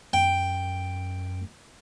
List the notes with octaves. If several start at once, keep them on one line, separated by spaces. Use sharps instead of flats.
F#2 G5